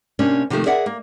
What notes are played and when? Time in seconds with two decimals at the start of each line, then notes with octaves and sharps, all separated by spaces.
0.19 C3 A#3 C#4 D4
0.50 C3 D#3 F3 F#3 A3 A#3
0.66 G#4 A#4 D5 E5 F#5
0.86 A#3